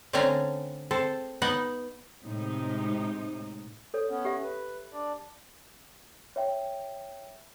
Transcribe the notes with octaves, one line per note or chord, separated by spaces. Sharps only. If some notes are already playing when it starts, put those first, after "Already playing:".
D3 A3 C4 C#4 G#5 A#5
C4 A4 C5
B3 D#4 F#5
A2 C3 G#3 D#4
A4 C#5
B3 C#4
G4 E5
B4
D4 D5
C#5 E5 G5